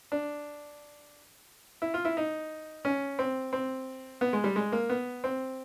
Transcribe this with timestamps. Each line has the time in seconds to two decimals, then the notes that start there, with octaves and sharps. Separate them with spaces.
0.12 D4
1.82 E4
1.94 F4
2.05 E4
2.17 D#4
2.85 C#4
3.19 C4
3.53 C4
4.21 B3
4.33 G#3
4.44 G3
4.56 G#3
4.72 A#3
4.90 B3
5.24 C4